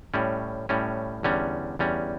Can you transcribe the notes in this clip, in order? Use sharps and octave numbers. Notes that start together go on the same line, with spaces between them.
A2 G3 C#4
A2 G3 C#4
E2 D3 G3 C#4
E2 D3 G3 C#4